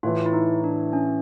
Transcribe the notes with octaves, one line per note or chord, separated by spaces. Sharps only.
A2 E3 A3 F4
E4
D#4
D4
C#4